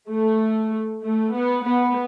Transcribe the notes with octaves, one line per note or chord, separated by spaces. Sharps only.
A3
A3
B3
B3